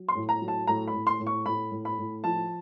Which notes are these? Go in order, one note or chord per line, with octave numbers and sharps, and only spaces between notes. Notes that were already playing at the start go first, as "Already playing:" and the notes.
Already playing: F#3
C6
A2
A#5
F#3
A5
A2 A#5
B5
A2
C6
A2
C#6
A2 B5
A2
B5
A2
F3 A5